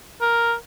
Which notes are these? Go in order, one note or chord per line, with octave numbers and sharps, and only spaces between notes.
A#4